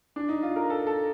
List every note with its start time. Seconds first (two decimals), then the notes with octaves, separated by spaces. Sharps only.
0.16 D4
0.29 D#4
0.43 F4
0.56 A#4
0.70 A4
0.87 A4